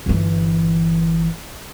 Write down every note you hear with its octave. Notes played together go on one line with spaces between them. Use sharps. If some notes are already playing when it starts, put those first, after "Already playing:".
G1 E3